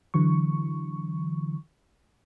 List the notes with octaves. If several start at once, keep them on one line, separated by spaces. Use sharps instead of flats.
D3 E3 F#3 C#6